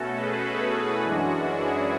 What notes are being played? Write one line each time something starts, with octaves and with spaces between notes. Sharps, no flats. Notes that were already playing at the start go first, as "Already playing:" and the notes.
Already playing: B2 A3 C#4 F#4 A4
G#4 B4
G#4 B4
E4 G#4
F#2 E3 G#3 C#4 D4 F#4
E4 G#4